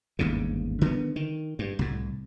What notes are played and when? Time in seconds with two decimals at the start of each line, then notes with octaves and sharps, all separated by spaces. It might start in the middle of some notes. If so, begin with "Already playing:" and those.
0.19 G1 D#2 G#2 C#3
0.81 D3 D#3 G3 B3
1.16 D#3
1.59 G2
1.79 C2 A2